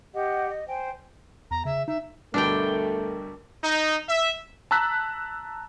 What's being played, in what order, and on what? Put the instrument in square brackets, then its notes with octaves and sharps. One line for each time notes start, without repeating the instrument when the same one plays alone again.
[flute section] G4 D#5 F#5
D#5
C5 G5 G#5
[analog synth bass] E2 [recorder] A#5
[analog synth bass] C#3 [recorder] E5
[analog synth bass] D#4 [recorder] E5
[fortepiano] D2 G2 B2 [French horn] A3 [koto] D4 G5 [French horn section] A#4
[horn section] D#4
E5
[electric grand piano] A5 A#5 E6 F#6 B6